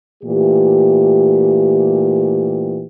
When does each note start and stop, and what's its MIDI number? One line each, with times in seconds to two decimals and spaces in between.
0.23 2.85 46
0.23 2.85 52
0.23 2.85 57
0.23 2.85 67